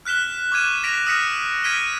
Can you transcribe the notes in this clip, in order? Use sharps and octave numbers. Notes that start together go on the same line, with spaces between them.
F6 F#6 B6 E7 G7
C#6 D6 F6 G#6 D#7 E7
A#6 B6 D7 F7
D#6 F6 A#6 B6 C#7 E7
F6 G#6 B6 D7 D#7 G7